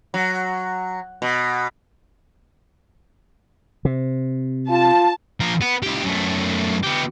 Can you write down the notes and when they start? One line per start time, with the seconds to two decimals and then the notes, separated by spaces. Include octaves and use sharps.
0.14 F#3
1.22 B2
3.85 C3
4.70 F4 A5
5.40 F3 A#4
5.61 B3
5.83 C#2 G4
6.04 F#2 A3
6.84 B3 G4